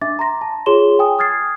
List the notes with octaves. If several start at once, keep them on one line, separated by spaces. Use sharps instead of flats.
D4 E5 D6 A6
A#5 C6 A#6
A5
F4 G#4 C#5 C6 E7 G7
G5 G#5 D#6
D#6 F6 G#6 A6 C7